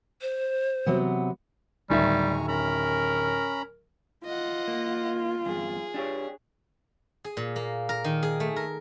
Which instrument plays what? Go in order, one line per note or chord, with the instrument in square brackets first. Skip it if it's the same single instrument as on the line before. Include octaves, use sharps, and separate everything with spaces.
[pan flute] C5
[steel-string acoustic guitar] C3 F#3 B3
[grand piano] D1 D#3 E5 [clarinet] G3 [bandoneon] G#5 A#5 C#6
[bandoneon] C#4 A#5 B5 [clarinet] A#4
[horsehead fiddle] F4 [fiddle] D#5 F#5
[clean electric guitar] A#3
[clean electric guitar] E2 G2 [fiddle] G#4
[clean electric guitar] D4 G4 C#5
[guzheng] G#4
A#2
A#3
A#4
D#3
G#4
A3
A#4